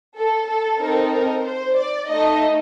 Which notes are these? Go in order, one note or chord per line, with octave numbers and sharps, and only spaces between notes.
A4
A4
C4 D#4 A4 A#4
A#4
C5
D5
A3 D#4 A4 D#5